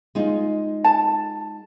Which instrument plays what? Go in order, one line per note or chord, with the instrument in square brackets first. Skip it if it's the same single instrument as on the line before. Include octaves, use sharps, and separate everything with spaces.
[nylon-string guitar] G#3 D#4 F4
[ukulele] A5